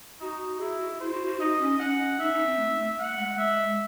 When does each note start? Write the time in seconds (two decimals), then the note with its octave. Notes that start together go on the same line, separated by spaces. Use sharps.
0.20 D#4 F#4
0.60 E4 G#4
0.80 F#4
1.00 E4 C5
1.13 F#4
1.27 F#4
1.40 D#4 D#5
1.60 C#4
1.79 C#4 F#5
2.19 D#4 E5
2.33 D#4
2.46 C4
2.59 A3
2.79 A3
2.99 A3 F#5
3.10 A3
3.19 G#3
3.38 E5